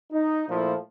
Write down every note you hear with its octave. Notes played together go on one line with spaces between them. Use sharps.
D#4
A#2 F3 A3 E4